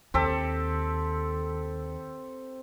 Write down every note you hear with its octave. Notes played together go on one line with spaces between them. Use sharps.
D#2 C4 G4 A4